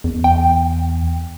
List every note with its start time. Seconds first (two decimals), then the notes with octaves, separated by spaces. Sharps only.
0.04 E2
0.24 G5